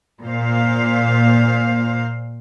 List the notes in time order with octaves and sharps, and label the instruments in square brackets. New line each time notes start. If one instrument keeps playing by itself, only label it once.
[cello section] A#2 C5 F5